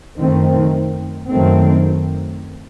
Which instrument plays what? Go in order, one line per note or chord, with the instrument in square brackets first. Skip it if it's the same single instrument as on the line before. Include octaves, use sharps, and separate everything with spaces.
[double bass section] F#2 D#3 A3 C4
F#2 D#3 F#3 A3 C4